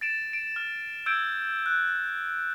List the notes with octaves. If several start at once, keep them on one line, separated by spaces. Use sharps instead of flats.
A6 D7 E7
D7
F6
E6 G6 G#6 D7
F#6